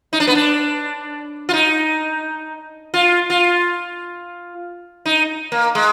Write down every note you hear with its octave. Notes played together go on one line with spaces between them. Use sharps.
D#4
D4
B3
D4
F4
D#4
F4
F4
D#4
A#3
G#3